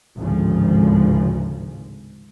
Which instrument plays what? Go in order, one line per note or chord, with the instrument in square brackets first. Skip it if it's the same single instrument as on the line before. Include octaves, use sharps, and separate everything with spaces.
[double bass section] G#1 D2 A2 C#3 F3